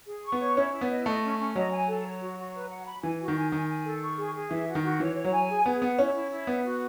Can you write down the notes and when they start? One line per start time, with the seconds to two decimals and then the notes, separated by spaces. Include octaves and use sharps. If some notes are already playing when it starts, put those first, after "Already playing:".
0.07 G#4
0.25 C#6
0.32 B3
0.40 C#5
0.57 C#4 E4
0.73 E4
0.81 B3
0.90 D#5
1.06 A3 D#5
1.23 C#4
1.39 C#4
1.55 F#3 D#5
1.71 G#5
1.88 A4
2.05 C#5
2.22 F#4
2.37 F#4
2.54 B4
2.71 F#5
2.86 B5
3.03 E3 G#5
3.20 F#4
3.28 D#3
3.36 G#5
3.52 D#3 G#5
3.69 G#5
3.85 A4
4.02 C#6
4.18 G#4
4.35 G#4
4.51 E3 E5
4.68 F#4
4.75 D#3
4.83 F#4
5.00 E3 C#5
5.16 C#5
5.25 F#3
5.32 G#5
5.49 G#4
5.66 B3 G#4
5.82 B3 F#5
5.98 C#4 E4
6.15 E4
6.32 E4
6.47 B3 F#5
6.65 F#4